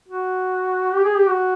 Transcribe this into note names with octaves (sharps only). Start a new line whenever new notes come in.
F#4
G4
G#4
G4
F#4